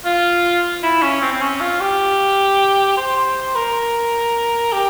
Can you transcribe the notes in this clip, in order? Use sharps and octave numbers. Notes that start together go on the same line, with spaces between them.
F4
E4
C#4
C4
C4
C#4
F4
G4
C5
A#4
G4